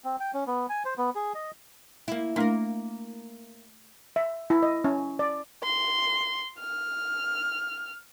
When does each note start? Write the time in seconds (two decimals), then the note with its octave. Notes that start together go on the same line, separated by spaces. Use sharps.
0.04 C4
0.20 G5
0.34 C#4
0.47 B3
0.69 G#5
0.85 C5
0.98 B3
1.15 G#4
1.35 D#5
2.08 A#3 E4
2.36 A3 A#3 D4 E4 A#4
4.16 E5
4.50 E4
4.63 D#5
4.84 C#4
5.19 D5
5.63 C6
6.60 F6